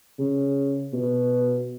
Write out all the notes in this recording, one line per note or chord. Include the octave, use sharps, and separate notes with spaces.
C#3
B2